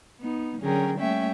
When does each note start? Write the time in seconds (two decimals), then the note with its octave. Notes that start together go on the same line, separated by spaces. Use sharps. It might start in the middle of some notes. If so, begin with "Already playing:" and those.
0.19 B3 D#4
0.60 D3 F#3 C#4 G#4 A#4 G5
0.99 G3 A3 A#3 C#4 E5 G5